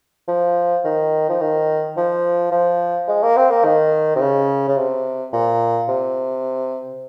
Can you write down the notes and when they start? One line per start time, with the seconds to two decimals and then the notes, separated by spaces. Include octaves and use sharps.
0.28 F3
0.84 D#3
1.29 F3
1.41 D#3
1.97 F3
2.52 F3
3.08 G#3
3.23 A#3
3.37 C4
3.50 A#3
3.64 D#3
4.15 C3
4.21 C#3
4.68 C#3
4.77 C3
5.33 A#2
5.88 C3